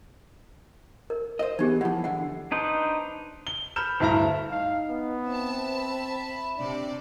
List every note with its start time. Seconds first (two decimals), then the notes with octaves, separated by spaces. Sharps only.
1.10 A#4
1.39 C5 D#5
1.59 E3 B3 D#4 G4 G#4
1.81 A2 F3 F4 F#5
2.04 D3 E3 F#5
2.52 D4 D#4 B4 C5
3.47 G7
3.76 B5 F6 G6 E7
4.00 D2 G2 E4 E5 A5 A#5
4.51 D#4 F5
4.89 B3
5.27 C4 E5 A5
5.78 B5
6.57 C3 D4 D5